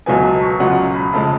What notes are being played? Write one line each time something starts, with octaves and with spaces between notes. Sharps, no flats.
C#2 B2 F#3 B3 G#5
A5
C#6
C#2 B2 F#3 C#4 F4 F#5
B5
F1 C#3 F3 G#3 A5